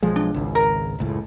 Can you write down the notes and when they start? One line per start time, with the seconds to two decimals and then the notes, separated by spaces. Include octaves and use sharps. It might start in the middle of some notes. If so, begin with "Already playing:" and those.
0.03 B1 F3 G#3
0.16 D4
0.34 G#1 C#2
0.55 A#4
0.99 F#1 C#2 A2